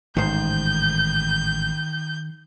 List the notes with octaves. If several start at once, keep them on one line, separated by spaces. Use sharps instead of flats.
A1 G#2 D#3 C5 G6